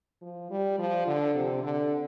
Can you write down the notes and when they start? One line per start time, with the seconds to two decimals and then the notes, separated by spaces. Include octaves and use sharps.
0.22 F3
0.51 G3
0.79 F3
1.07 D3
1.35 C3
1.63 D3